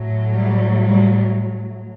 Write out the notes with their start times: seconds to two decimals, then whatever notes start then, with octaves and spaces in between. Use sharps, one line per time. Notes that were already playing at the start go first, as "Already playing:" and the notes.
Already playing: A2 F#3
0.33 G3
0.82 G3